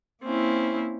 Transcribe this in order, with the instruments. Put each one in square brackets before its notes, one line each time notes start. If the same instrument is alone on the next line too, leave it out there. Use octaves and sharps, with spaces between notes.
[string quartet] A#3 E4 [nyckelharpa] C4 C#4